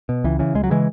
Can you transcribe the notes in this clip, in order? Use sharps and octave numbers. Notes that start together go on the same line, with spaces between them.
B2
C#2 E3
C#3 E3
C#2 G#3
F#3
C#3 E3 G#3